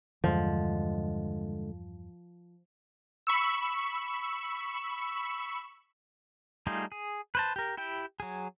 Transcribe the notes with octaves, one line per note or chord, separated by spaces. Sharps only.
E2 G2 D3 F3 G#3
B5 C#6 E6
G3 A3 D#4 F4 G#4
G#4
B4 C5 A5
G4 A#4
E4 G4 G5
F#3 G#4